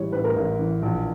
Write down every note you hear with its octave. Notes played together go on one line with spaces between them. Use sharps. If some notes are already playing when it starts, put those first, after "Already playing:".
Already playing: A1 E3 G3 C#5
A2 B4
A#4
A1
E3
A#1